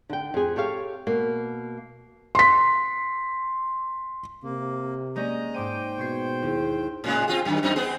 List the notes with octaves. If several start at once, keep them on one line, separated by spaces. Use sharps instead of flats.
D3 G5
F2 G#4
G4 A4 C#5 F5
B2 A#3
C6 B6
C3 A#3
G#3 A#3 C#4 D5 D#5 A#5 G6
G#2 C5 G5 D6 D#7
B2 C#6 G#6 C7
D#2 E4 G#4
A2 C#3 G#3
C4 F4 G#4
F#2 D#3
F#2 C4 D#4
B3 C4 G#4